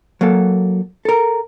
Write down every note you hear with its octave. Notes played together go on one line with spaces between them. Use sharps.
F#3 A#3 A4
A4 A#4